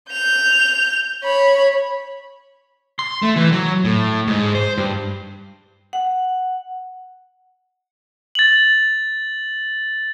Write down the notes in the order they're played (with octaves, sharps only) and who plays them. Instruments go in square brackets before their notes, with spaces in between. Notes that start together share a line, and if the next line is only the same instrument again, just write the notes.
[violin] G6 F7
C#5 B5
[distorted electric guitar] C6
A3
E3
F#3
A2
G#2
C5
G2
[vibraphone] F#5
[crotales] A6 F#7